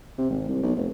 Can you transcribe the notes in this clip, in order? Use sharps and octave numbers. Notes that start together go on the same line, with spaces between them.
C3
G#1
C2
B1
F1